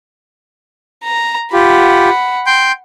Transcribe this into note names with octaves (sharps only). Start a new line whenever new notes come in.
A#5
F4 G4 F#5 B5
G5 C6 G6